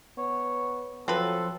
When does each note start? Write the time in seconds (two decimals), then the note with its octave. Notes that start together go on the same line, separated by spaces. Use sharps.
0.18 B3 C#5
1.08 F3 F#3 C4 F4 A4 B4 C6